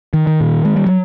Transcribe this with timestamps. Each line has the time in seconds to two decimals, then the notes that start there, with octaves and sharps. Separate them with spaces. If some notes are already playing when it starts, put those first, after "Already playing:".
0.14 D#3
0.27 D#3
0.41 A#2
0.65 G#3
0.76 G3
0.87 F#3